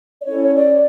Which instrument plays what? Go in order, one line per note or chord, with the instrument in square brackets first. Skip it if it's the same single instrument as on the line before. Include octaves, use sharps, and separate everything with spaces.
[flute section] D5
C#4 E4 A4 C#5
C#5
D5